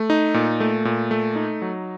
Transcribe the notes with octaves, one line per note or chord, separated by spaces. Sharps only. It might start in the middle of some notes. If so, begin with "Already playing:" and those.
Already playing: A3
D#4
A#2
A3
A#2
A3
D#4
F#3